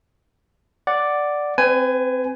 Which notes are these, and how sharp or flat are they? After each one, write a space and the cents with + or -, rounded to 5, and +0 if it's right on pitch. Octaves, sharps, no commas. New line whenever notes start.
D5 +0 F#5 +0
C4 -5 B4 +40 G#5 +0